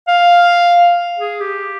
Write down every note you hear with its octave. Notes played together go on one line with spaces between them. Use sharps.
F5
G#4
G4